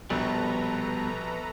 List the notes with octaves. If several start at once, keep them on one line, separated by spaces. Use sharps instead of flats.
A#1 B2 G3 A4 B4 A#5